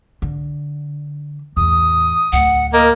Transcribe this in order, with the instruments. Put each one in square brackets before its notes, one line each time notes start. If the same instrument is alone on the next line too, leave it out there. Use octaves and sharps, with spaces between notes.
[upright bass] D3
[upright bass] E2 A2 [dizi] D#6
[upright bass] D1 D2 [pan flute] F#5
[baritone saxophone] A#3 [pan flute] A#4 [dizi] D#5